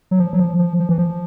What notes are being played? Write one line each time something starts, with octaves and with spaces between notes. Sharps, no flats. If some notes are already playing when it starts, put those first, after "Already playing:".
F#3
F3
F#3
F3
F3
F3
E3
F3